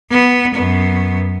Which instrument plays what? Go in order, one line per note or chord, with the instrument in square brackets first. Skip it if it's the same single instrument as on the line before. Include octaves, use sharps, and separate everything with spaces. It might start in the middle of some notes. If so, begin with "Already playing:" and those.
[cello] B3
F#2 B3